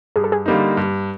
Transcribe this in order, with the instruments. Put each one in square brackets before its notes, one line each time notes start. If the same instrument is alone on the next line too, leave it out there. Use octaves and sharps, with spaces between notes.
[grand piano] G2 [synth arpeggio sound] G#4
[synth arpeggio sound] A4
G#4
[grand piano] D3 G3 A#3 D#4
G2